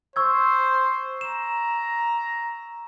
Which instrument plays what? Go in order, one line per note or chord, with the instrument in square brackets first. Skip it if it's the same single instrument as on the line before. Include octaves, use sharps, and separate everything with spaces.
[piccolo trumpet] C5 [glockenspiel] C#6 E6 G#6
[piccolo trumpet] A#5 [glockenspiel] E7